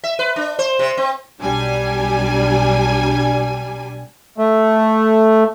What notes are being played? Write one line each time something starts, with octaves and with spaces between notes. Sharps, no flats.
E5
B4
D4
C5
C3
C4
B1 G3 D4 G#5
A3